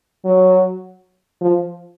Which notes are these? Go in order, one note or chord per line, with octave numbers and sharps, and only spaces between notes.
F#3
F3